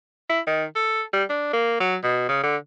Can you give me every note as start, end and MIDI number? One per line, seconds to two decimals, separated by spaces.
0.30 0.41 64
0.47 0.65 51
0.76 1.02 69
1.13 1.24 55
1.30 1.52 62
1.53 1.77 58
1.80 1.96 54
2.03 2.25 47
2.29 2.41 49
2.44 2.57 50